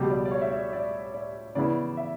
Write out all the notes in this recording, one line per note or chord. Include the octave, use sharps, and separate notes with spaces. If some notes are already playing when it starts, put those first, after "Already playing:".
Already playing: C#2 B2 G3
D5
D5
C#5
E5
D5
D5
D5
C#3 E3 B3 E4 D5
E5